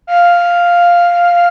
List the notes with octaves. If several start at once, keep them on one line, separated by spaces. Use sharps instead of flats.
F5